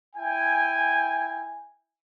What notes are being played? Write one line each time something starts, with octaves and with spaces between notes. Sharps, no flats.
E4 G5 G#5